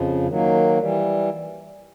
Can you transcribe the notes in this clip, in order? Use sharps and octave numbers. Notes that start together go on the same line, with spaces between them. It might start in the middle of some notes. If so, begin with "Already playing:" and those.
Already playing: F2 C#3 F3
D#3 F#3 A#3
E3 G3